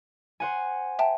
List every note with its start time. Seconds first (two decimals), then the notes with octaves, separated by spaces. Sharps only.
0.40 C5 F#5 G#5
0.99 E5 G5 A5